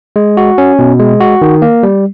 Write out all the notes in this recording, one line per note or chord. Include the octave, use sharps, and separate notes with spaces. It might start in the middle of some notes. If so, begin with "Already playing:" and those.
G#3
F#4
C#4
B2
G#3
F#4
D#3
A#3
G3